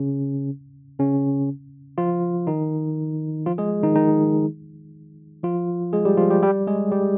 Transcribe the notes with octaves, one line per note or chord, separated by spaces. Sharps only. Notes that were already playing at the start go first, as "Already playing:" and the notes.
Already playing: C#3 C#4
C#3 C#4
F3 F4
D#3 D#4
F3 F4
G#3 G#4
D#3 D#4
D#3 D#4
F3 F4
G#3 G#4
G3 G4
F3 F4
G3 G4
G3 G4
G#3 G#4
G3 G4